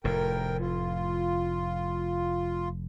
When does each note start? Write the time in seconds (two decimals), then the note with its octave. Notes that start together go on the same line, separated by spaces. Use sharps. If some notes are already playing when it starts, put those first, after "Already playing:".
0.04 F1 A2 A#4 G5
0.60 F4